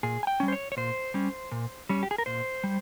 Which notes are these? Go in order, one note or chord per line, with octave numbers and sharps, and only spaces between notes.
A#2 G#4
G#5
G5
G3 C#4
C5
C#5
C#5
A#2 C5
G3 C#4
A#2
G3 C#4
G4
G#4
A#4
A#2 C5
G3